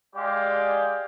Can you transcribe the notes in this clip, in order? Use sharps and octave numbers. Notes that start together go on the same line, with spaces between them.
G#3 G4 D5 F5